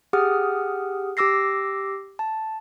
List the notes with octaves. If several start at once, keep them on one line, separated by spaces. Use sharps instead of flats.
G4 G#4 F#5 D#6 F6
G4 D6 E6 A#6 C7
A5